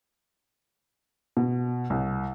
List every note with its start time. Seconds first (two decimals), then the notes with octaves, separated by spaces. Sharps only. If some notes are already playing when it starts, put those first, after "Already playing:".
1.37 B2
1.90 C2